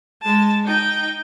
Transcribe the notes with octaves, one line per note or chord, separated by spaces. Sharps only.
G#3 A5
D#4 G5